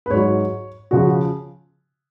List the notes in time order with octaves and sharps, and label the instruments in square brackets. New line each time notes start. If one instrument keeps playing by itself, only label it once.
[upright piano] B4
G#2 F#3 C#5
C#3 F3 F#4